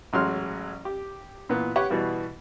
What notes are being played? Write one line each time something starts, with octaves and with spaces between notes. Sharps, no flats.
A1 F#3 G#3 C6 F6
G4
A#2 E3 B3
G4 B4 C#5 F#5 C#6
B2 E3 G3 B3 F#4